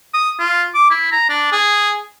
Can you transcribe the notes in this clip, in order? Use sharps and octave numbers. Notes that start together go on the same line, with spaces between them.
D#6
F4
D6
E4
A#5
D4
G#4